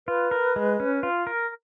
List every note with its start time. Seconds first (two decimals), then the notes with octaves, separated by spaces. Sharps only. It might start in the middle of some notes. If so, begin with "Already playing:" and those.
0.07 F4 B4
0.31 A#4
0.56 G#3
0.80 C#4
1.03 F4
1.27 A#4